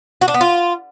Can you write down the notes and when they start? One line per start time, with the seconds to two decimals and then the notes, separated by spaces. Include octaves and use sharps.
0.21 F#4
0.28 D4
0.34 B3
0.41 F4